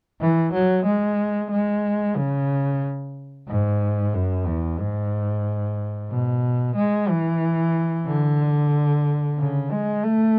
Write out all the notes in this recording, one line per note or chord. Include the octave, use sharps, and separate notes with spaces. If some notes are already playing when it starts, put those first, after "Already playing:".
E3
F#3
G#3
G#3
C#3
G#2
F#2
E2
G#2
B2
G#3
E3
D3
C#3
G#3
A3